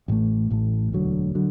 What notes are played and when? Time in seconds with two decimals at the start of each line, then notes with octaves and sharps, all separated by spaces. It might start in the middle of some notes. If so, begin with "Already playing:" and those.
0.08 A1 A2 A3
0.51 A1 A2 A3
0.93 E1 D2 D3 F#3
1.35 D3 F#3